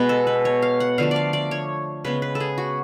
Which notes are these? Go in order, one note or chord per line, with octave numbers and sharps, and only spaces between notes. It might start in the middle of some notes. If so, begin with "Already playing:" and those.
Already playing: B2 G#3 B3 B4
A4
B4
C#5
F5
F#5
D3 F3 A3 F5
D5 F5
D5
C#5
C#3 G#3 B3 B4
B4
A4
G#4
F#4